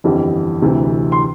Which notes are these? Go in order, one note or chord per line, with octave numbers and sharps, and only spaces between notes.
G1 F2 E3 G3
D2 C3 E3
C6